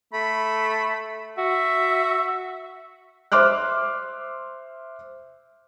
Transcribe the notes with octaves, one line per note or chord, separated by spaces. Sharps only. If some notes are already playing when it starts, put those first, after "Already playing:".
A3 B5
F#4 E5
C5 E5 C6 D6 F6 F#6